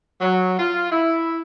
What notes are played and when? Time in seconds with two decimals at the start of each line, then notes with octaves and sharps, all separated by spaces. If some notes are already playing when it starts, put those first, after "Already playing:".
0.21 F#3
0.59 F4
0.92 E4